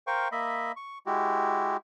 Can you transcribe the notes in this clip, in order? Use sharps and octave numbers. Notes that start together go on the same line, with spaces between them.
A#4 C5 F5 G5 C#6
A#3 D#5 E5 B5
C#6
G#3 E4 F#4 G4